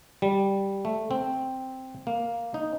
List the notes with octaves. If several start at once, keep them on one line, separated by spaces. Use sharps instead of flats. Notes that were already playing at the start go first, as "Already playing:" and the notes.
G3
A3
C4
A#3
D#4